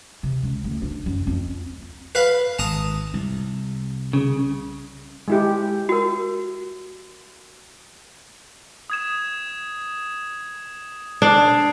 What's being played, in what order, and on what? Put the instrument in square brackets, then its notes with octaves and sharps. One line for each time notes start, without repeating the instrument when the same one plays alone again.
[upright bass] C3
C#2
D2
D4
F#2
F2
[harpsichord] B4 F5 B5
[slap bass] G#1 [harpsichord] A5 A#5 D#6
[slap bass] C2
[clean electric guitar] C#3
[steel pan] G#3 E4 G4
[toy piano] F#4 A#4
[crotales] D#6 G#6 E7
[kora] D4 [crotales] D#6 C7 D7